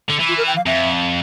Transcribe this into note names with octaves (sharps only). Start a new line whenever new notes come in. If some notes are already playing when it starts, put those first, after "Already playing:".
D3
E3
F4
A#4
G5
F5
F2 E5